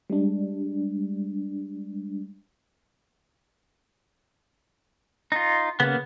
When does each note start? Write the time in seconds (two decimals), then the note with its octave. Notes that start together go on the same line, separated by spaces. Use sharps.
0.10 G3 G#3 D4
5.32 D#4 F4
5.80 C#3 A#3 B3